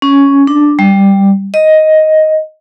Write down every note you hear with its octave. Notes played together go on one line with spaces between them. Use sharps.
C#4
D4
G3
D#5